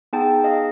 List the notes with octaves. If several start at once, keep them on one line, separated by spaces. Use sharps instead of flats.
B3 D#4 G#4 G5 A5
D#5 F5